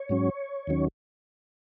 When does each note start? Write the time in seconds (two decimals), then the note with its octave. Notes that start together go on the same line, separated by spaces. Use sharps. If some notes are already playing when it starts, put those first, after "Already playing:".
Already playing: C#5
0.09 G#2 F#3 C#4
0.67 D#2 D#3 F#3 C#4